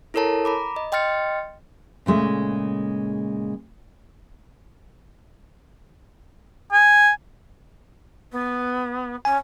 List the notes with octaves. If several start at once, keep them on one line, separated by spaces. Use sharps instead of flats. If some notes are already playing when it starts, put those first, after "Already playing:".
E4 A4 A#4 C#5 A5 A#5
A#5 B5 D6
D#5
D#5 G5 C6 F6 A6 C#7
A#2 C#3 G#3 A3
G#5
B3
C#4 G#5